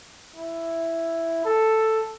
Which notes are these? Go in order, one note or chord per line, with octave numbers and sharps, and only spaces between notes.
E4
A4